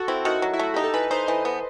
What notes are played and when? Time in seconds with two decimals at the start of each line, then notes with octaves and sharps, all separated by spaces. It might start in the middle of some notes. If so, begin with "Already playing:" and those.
Already playing: F#4 A4
0.08 C4 E4
0.25 D#3 F#4
0.42 F#3
0.53 E4
0.59 A3 F#4
0.74 D#4 G4
0.84 A4
0.94 E3 B4
1.11 D#4 C5
1.28 E3 D#5
1.45 B3